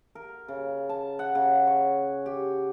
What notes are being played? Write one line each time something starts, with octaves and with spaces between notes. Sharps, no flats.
A#4
C#3
A5
F#5
C#3
C#5
G4